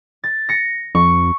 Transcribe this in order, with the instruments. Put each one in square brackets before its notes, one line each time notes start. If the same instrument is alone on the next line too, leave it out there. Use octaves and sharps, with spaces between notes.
[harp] A6
A#6 C#7
[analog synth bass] F2 [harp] C#6